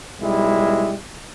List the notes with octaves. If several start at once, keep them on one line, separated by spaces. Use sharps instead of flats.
B1 G3 G#3 E4